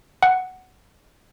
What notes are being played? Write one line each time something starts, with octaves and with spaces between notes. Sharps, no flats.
F#5